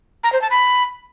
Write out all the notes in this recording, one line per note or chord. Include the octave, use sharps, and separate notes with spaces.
A#5
C5
A5
B5